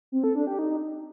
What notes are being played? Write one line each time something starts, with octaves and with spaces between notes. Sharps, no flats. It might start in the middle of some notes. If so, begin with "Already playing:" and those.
C4
A4
D4
G4
D#4